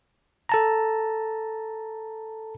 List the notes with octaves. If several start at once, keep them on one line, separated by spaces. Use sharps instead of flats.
A4 A5 A#5